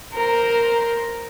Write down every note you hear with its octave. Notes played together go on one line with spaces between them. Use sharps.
A#4 C5